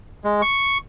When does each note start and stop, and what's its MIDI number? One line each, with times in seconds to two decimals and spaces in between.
0.24 0.42 56
0.42 0.78 85